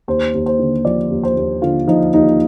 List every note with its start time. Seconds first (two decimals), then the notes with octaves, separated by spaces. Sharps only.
0.08 D#2 C5
0.34 D#2
0.46 C5
0.59 D3
0.85 F3 D5
1.11 D#2
1.23 C5
1.37 D#2
1.62 D3 F4
1.87 F3 D#4
2.13 D#2 D#4